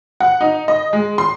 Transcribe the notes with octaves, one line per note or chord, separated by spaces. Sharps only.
F#5
D#4
D#5
G#3
C6